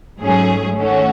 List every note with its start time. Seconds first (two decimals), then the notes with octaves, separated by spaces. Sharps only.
0.20 G#2 F#3 A3 C#4 G#4
0.78 D#3 A3 C#4 F#4